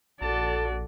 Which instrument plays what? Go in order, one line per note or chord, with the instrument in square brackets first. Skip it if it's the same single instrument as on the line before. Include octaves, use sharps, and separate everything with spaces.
[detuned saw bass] A#1 [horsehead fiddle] F#4 D5 [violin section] A4 [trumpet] A5